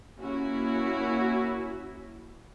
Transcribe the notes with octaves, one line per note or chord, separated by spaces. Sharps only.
A#3 C#4 E4 F#4